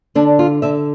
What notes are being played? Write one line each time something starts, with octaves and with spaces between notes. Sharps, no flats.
D3 D4
F4
D3 E5